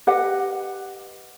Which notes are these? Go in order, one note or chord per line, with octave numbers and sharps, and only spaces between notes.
G4 B4 D#5 F#5